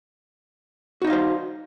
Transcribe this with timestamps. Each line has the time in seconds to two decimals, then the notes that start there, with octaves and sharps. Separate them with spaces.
1.02 F#4
1.04 D#4
1.07 D#5
1.10 F5
1.13 C5